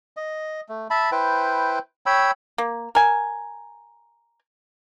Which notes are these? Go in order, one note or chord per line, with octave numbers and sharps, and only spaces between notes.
D#5
A3
E5 A5 B5
E4 B4 C5 G5
C#5 G5 B5 E6
A#3
A#4 G#5